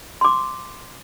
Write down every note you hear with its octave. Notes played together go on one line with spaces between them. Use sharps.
C6 D6